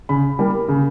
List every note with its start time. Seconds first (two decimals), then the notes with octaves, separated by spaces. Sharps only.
0.09 C#3 B5
0.39 G3 A#3
0.68 C#3